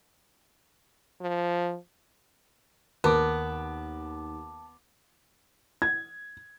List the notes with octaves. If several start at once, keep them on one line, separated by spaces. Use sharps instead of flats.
F3
D#2 B3 A#4 A5 D6
G#6